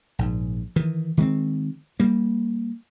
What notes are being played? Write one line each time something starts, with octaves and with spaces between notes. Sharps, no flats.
A#1 G#2
D#3 E3
D#3 G#3 A#3 C4
G3 A#3